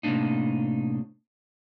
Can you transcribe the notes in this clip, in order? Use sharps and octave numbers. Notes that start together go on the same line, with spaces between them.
A2 C3 F3 A#3 D4 D#4